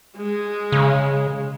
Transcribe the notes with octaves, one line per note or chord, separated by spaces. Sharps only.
G#3
C#3